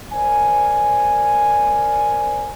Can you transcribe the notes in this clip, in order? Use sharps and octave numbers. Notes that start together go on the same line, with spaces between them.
A#4 C5 D5 G#5